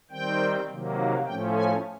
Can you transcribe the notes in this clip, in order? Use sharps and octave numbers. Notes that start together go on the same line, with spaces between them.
D#3 G3 C4 G5
C3 D#3 F#3 A#3
A2 F3 A3 C#4 G5
G#5